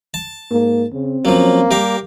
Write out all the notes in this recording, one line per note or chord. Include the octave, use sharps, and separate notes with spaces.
A5
G#2 A#3
C#3 C4
F3 F#3 A#3 C#4
G3 G4 A#4 F5